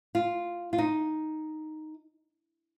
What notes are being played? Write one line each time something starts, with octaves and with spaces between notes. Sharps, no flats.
F4
F4
D#4